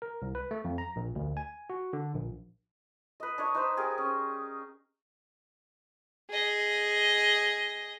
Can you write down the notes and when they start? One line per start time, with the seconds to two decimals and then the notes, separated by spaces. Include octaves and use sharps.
0.02 A#4
0.22 C2
0.35 B4
0.51 A3
0.65 F2
0.78 A#5
0.96 A#1
1.15 D2
1.37 G#5
1.70 F#4
1.93 D3
2.15 A#1
3.20 B4 D#5
3.38 D4 C#5 D#5
3.55 D#4 B4 C5 B5
3.77 G4 G#4 A#4
3.98 C#4
6.30 G#4 D#5